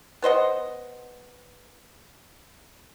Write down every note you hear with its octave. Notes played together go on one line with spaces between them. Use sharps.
B3 C5 D#5 F#5